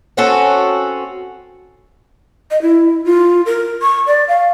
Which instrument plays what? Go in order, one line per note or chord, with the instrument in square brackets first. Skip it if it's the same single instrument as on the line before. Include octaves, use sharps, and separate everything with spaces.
[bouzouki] C4 C#4 F#4 A4
[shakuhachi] D#5
E4
F4
A#4
C#6
D5
F5